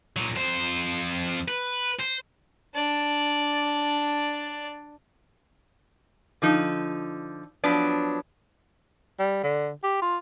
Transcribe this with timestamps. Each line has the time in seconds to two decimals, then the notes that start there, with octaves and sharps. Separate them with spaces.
0.17 A#2 F#3
0.36 F2 C5
1.48 B4
2.00 C5
2.74 D4 D5
6.42 D3 F3 D#4
7.64 F3 F#3 B3 D4
9.19 G3
9.43 D3
9.83 G4
10.02 F4